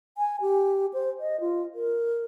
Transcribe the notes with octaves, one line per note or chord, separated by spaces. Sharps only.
G#5
G4
C5
D#5
F4
A#4